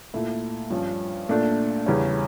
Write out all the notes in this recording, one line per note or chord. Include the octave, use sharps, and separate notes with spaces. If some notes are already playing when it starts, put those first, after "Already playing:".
A#2 A3 E4
G2 F3 C#4
A#2 A3 D4
E2 C#3 G3 C#4